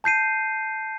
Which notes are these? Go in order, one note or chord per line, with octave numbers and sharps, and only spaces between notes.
A5 G6 C7 D#7